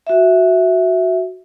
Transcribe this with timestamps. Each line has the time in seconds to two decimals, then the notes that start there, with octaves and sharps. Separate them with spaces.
0.07 F#4 E5